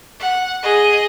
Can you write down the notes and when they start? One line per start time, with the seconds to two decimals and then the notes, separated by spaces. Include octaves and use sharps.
0.20 F#5
0.63 G#4 D#5